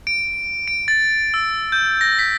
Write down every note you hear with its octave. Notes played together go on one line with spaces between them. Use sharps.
D7
D7
A6
E6
G6
A#6
B6